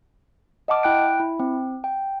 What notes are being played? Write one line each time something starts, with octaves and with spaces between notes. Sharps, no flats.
D#5 F#5 A5 D6 F6
E4 G5 F#6 D7
E4
C4
G5